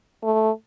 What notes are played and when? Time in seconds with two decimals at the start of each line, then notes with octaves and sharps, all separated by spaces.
0.24 A3